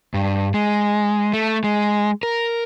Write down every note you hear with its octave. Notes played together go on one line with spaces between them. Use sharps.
G2
G#3
A3
G#3
A#4